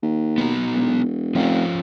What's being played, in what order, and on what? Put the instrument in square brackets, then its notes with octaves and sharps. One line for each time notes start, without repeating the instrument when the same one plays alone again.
[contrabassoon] D#2
[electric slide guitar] B3 D#4 F#4
[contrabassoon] E1
[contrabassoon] F1 [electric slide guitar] F3 C#4 F4